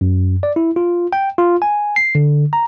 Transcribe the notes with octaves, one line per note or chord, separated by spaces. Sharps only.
F#2
D5
E4
F4
G5
F4
G#5
C7
D3
A#5